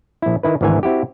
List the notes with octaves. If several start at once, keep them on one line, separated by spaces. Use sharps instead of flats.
A#1 E4
D#3 E4 B4
G#1 D2 E3 A#4 G#5
C4 E4 F#4 G4